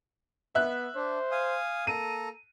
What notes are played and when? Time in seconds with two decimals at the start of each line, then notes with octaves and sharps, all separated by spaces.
0.55 B3 E5 F#6
0.95 D4 C5
1.31 F5 G#5 D#6
1.87 A#3 A4 A#5 D#7